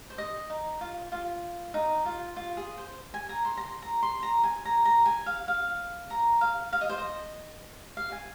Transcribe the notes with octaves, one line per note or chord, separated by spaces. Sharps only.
C5
D#5
D#4
F4
F4
D#4
F4
F4
G#4
C5
G#5
A#5
C6
A#5
C6
A#5
C6
A#5
G#5
A#5
A#5
G#5
F5
F5
A#5
F5
F5
D#5
C5
D#5
F5
G#5